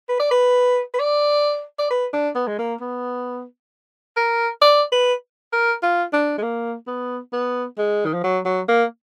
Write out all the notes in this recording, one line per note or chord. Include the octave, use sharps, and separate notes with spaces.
B4
D5
B4
B4
D5
D5
B4
D4
B3
G#3
A#3
B3
A#4
D5
B4
A#4
F4
D4
G#3
A#3
B3
B3
G#3
D#3
F3
F#3
F#3
A#3